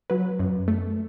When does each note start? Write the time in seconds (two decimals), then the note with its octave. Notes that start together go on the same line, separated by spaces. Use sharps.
0.10 F#3 B4
0.39 F#2
0.68 A3